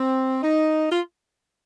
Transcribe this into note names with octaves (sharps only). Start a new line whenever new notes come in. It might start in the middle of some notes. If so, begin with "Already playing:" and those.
Already playing: C4
D#4
F4